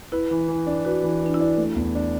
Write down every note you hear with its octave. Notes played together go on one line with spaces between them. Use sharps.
E4 B4
E3
E3
D4
F#4 B4
E3
E3 D4
E4
D4
A3
E2
D4